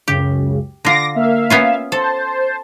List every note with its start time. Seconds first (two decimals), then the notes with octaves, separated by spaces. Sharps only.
0.08 C#2 F#2 C#3 G4
0.85 D3 F4 D6 A#6
1.15 A#3 E5 F5
1.50 B3 C#4 F4
1.92 A4 C5 A5